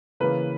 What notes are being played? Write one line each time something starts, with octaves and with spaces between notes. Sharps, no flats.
C#3 E3 A#3 B4